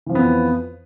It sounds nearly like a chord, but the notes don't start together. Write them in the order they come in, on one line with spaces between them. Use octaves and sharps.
E3 F3 F2 B3